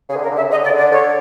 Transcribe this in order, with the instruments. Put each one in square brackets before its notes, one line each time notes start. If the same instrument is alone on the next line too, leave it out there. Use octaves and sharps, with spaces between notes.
[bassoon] C#3 [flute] G#4
[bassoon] D3
[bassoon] C#3 [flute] A#4
[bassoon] D3
[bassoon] C#3 [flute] E5
[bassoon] D3 [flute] D#5
[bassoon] C#3 [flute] D5
[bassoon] D3
[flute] D5
[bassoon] D3 [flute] C#5